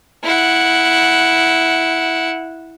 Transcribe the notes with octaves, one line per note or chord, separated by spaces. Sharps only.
E4 F#5